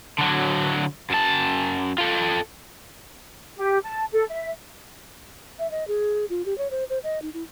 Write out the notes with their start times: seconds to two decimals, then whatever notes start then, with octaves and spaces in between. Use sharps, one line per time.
0.19 D3 F#3
1.10 F#2 A5
1.98 F4 A4
3.58 G4
3.84 A5
4.12 A4
4.29 E5
5.59 E5
5.71 D#5
5.88 G#4
6.30 F4
6.46 G4
6.58 C#5
6.71 C5
6.90 C5
7.04 D#5
7.22 D#4
7.34 E4